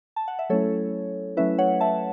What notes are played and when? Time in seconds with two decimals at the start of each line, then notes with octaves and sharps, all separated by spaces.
0.16 A5
0.28 F#5
0.39 E5
0.50 F#3 A3 C#4 E4 A4 C#5
1.37 F#3 A3 C#4 E4 B4 E5
1.58 C#5 F#5
1.81 E5 A5